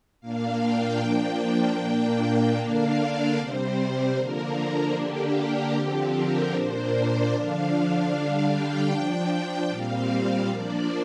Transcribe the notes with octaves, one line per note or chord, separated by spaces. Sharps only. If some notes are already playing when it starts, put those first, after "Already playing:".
A#2 A#3 D4 F5
G5
F3 A#3 D4
A#2 A#3 D4
D3 A#3 D4 F5
D5
C3 G3 C4 C5
D3 F3 A#3 D4 A#4
D3 A#3 D4 G4
A#4
D3 F3 C4 G4
A#4
A#2 A#3 D4 C5
D5
D3 F3 D4 F5
F5
D3 G3 D4 F5
G5
F3 D4
A#2 G3 C4 F5
F3 A#3 D4 D5